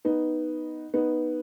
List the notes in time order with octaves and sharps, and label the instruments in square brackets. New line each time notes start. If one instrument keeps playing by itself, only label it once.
[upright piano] B3 D#4
B3 D#4